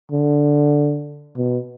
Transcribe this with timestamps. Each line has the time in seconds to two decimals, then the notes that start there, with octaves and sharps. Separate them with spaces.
0.12 D3
1.37 B2